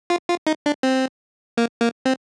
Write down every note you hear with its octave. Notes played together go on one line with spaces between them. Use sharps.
F4
F4
D#4
D4
C4
A#3
A#3
C4